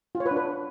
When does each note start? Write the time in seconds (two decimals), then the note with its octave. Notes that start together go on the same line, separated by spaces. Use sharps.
0.15 F4
0.20 C#5
0.26 B4
0.31 D4
0.37 B4